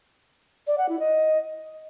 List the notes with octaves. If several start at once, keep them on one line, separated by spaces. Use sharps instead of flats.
D5
F#5
E4
D#5